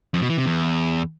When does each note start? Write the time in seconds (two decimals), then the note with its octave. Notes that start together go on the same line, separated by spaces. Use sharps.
0.14 F2
0.22 B2
0.30 E3
0.38 C3
0.46 E2